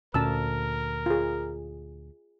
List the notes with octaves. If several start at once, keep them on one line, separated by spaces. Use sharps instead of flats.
D2 A#2 C#4 A#4 A5 E6
F4 G#4